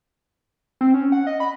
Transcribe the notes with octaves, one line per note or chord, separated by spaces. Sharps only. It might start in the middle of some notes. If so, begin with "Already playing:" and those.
C4
C#4
F#5
D#5
B5